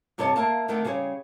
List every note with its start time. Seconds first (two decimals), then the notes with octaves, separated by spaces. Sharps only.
0.18 G2 C3 A4 C#5 D#5 A5
0.36 A#3 E5 F5 A5
0.68 D3 D#3 A3 C4
0.85 C#3 G3 G#4 B4 C#5